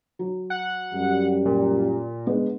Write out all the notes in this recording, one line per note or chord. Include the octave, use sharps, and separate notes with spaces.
F#3
F#5
F#2 G3
A#2
G#3 B3 D4